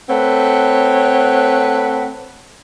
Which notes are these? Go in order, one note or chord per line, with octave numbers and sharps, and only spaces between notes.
A3 C4 B4 C#5 F#5